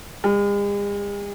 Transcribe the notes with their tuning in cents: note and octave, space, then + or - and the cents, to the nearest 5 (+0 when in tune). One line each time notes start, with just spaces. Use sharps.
G#3 -45